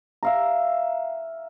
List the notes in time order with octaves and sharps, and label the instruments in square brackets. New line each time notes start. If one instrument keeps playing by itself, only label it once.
[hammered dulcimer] E5 F5 A#5